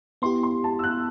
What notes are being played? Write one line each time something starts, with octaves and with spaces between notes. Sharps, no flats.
B3 E4 G4 C6
C6
A5
E6
F#6